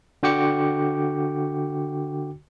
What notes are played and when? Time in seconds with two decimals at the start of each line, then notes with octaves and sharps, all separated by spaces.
0.23 D3 F#4 G5 D6 C#7